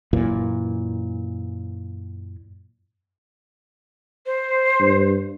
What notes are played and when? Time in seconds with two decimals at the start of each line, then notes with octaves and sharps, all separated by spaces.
0.13 F#2 A#2 E3
4.26 C5
4.80 G2